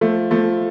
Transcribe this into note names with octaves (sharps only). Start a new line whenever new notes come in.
F3 A3
F3 A3